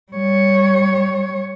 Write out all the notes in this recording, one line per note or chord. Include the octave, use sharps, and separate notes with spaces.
G3 C#5